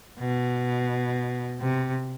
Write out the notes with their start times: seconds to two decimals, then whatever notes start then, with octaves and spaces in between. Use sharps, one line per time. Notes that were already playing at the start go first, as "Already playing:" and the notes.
0.19 B2
1.60 C3